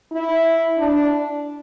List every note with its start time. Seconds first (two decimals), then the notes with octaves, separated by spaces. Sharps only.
0.12 E4
0.78 D4